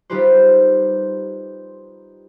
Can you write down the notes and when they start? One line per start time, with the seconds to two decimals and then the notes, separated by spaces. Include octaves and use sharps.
0.10 G3 D#4 F4 G4 B4 C5